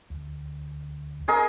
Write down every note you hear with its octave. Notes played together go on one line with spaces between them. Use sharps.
D2
G#4 A#4 D#5 G#5